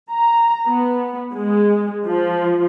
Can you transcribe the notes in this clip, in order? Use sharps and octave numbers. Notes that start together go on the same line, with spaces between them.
A#5
B3
G#3
F3